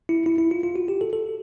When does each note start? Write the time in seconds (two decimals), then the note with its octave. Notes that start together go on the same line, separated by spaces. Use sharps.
0.09 E4
0.26 E4
0.38 E4
0.51 F4
0.63 F4
0.76 F#4
0.88 G4
1.01 A4
1.13 A4